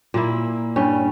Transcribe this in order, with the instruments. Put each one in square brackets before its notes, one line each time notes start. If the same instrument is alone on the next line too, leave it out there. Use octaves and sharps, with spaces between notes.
[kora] A#2 A#3 E4
G2 G3 C#4